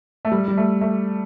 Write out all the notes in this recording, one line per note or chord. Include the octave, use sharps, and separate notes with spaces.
A3
G3
G3
A3
A3